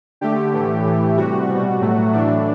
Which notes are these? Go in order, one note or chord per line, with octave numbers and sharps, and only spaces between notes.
D3 A3 G4
A2 E3 A3
A2 E3 A3
C3 G3 F#4
B2 G3
A2 F#3 A3
A2 E3 A3 D4